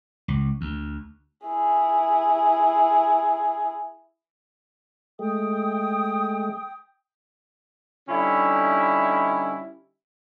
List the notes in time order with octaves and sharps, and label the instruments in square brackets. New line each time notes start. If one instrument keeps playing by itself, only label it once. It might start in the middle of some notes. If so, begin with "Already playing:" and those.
[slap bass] C#2
D2
[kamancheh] E4 G#4
[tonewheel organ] G#3 A3 [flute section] G5 D#6
[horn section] D3 G3 C#4 D#4 E4